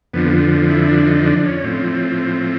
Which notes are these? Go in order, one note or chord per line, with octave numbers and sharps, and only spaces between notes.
F2 D3 F3 B3
E4
D4
D#4
D4
C#4
A2 F3 C4